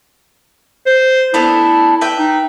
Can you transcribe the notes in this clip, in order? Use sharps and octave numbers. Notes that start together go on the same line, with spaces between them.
C5
B3 D4 E4 A4
B4 E5 G5
D#4